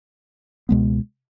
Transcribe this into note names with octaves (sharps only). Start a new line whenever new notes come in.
C#2 B2 G#3 B3